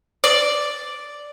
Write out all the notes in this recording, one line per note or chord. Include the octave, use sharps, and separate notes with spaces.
D5